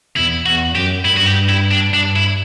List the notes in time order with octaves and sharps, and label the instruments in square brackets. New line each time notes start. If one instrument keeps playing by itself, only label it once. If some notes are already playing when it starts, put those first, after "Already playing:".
[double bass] E2 [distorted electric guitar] E4
[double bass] E2 [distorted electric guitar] F#4
[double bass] F#2 [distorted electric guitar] G4
[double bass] G2 [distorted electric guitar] E4
[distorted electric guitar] F#4
G4
E4
D4
[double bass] G2 [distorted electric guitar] D4
[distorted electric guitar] E4